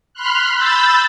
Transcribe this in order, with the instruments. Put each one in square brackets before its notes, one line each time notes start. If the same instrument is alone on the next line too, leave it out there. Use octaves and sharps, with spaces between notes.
[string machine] B5 C6 F6 F#6
B5 E6 G6 A6 B6